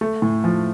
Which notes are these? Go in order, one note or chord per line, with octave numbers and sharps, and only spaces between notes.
A3
A2
F3